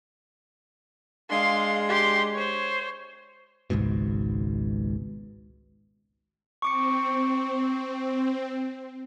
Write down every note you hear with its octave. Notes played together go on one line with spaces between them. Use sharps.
G#3 D4 F5 C6
G4 C6
C5 C#5
G#1 C#2 G#2 B2
C4 C#6 D6 C#7